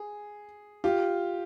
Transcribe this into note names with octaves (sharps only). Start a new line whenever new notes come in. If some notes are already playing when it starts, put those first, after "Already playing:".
Already playing: G#4
F4 G4